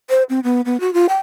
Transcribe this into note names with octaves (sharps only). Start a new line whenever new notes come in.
C5
C4
B3
B3
F#4
F4
G5